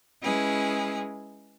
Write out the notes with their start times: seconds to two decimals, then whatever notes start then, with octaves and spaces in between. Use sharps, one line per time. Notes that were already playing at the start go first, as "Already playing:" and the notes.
0.20 G#3 C#4 E4 G#4 B4